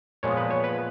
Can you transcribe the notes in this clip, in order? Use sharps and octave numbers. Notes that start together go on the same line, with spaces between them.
A#2 F3 G#3 B3 C#5
B4
C#5
B4